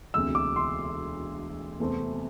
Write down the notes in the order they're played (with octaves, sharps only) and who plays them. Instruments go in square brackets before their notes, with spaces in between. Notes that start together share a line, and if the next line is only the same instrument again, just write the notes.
[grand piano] E1 D2 C3 E6
D6
C6
E2 C3 A3 C4